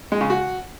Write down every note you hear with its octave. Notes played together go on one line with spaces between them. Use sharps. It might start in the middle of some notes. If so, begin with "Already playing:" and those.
G#3
C#3
F#4